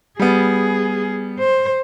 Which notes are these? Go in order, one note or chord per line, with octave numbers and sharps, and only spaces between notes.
G3 B3 G#4
C5